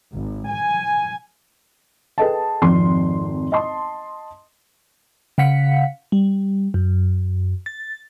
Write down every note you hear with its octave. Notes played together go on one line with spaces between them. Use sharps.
G#1
G#5
G#4 A4 B4 D#5 G5 A5
G#1 F2 F3 C6
D#5 A5 C6
C#3 F5 F#5 B6 C#7
G3
F#2
A6